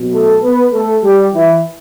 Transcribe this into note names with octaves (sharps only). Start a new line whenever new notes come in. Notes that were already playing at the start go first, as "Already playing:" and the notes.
Already playing: B2 F#3
A3 A4
B3 B4
A3 A4
G3 G4
E3 E4